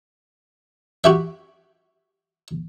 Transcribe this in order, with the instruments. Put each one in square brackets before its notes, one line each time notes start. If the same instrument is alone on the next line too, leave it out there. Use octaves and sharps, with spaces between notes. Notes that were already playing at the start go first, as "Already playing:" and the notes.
[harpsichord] F#4 G4 E5